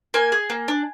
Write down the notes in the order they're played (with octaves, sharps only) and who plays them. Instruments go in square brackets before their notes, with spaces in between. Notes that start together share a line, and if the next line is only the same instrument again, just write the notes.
[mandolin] A#3 G#5
G#4
A#3
D4